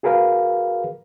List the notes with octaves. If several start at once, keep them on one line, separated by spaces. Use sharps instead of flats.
F#4 G#4 A#4 B4 F5